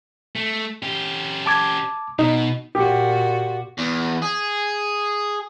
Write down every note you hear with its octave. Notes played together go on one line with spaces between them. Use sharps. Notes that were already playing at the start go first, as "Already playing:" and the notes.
A3
C#4 G4
A5 D6 G#6
B2 D#4
A#2 F#4 G4
E2
G#4